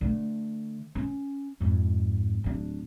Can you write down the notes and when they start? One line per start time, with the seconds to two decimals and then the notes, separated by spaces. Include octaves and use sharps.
0.01 D3 A3
0.95 C#4
1.60 F2 G#2
2.44 D1 D4